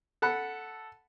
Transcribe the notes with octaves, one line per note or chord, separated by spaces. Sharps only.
A4 F#5 B5